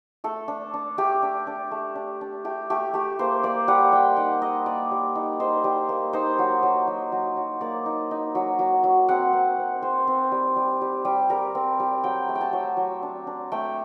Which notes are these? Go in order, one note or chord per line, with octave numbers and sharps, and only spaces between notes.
A3 A4
D4
D4
A3 G4
D4
D4
A3
D4
D4
A3 G4
A3 G4
A3 G4
A#3 C5
A#3 D5
G3 F#5
G3 G5
D#4 F#5
D#4 D#5
A#3 D5
G3
D#4
D#4 C5
G3
A#3
D#4 C5
F#3
F#3
F#3
F#3
F#3
A#3 D5
D#4
D#4
F#3
F#3
F#3
C4 F#5
C4
C4
C4 C5
C4
G3
G3
G3
G3
G3 A#4
C4
G3
F#3 G5
A3
G5
A5
F#3
F#3
D4
D4
A3 G5